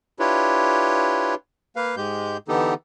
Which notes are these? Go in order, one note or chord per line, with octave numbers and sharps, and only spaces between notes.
D4 E4 F4 G4 B4 C#5
A#3 B4 F5
G#2 G#3 G4 G6
D3 E3 B3 D#4 G4 A4